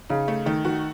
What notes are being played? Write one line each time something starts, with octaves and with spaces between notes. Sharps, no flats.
C#3 D#4
A3
D#3 A3
D#3 F#4